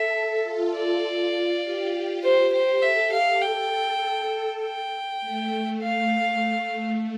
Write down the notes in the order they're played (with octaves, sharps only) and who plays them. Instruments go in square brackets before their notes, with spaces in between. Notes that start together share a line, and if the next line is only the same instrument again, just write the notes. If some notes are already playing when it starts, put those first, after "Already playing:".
Already playing: [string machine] A4 [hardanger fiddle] E5
[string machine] F4
[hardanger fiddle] D5
[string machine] G4
[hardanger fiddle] C5
C5
[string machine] A4 [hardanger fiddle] E5
[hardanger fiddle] F5
G5
G5
[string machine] A3
[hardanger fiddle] F5
[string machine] A3